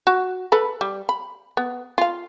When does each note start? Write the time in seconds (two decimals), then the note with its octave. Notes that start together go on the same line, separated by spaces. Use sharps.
0.07 F#4
0.52 A4 B4 B5
0.81 G3
1.09 B5
1.57 B3
1.98 F4 F5